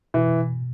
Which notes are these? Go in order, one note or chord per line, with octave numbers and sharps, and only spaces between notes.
B2 E3